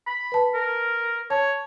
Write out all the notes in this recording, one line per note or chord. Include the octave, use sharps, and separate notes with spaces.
B5
B4 A5
A#4
C#5 A5